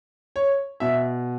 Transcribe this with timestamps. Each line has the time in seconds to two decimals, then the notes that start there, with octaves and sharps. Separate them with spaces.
0.36 C#5
0.80 B2 E5